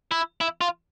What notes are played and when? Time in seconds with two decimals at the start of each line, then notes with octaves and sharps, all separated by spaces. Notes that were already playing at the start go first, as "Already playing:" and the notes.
0.11 E4
0.41 E4
0.61 F4